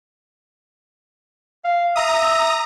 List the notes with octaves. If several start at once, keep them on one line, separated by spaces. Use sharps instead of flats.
F5
E5 A#5 D#6